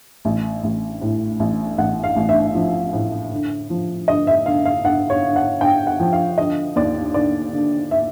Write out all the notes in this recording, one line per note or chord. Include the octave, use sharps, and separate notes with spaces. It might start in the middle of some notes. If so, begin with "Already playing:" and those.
A1
A1
A2
A1
A1 F#5
F5
A1
E5
F3
A2
D3
F3
D3 D#5
E5
D3 F5
F5
D3 F#5
C#5
D3
F#5
D3 G5
F#5
F3
F5
D3 D#5
D#2 D5
D3 D5
D3
E5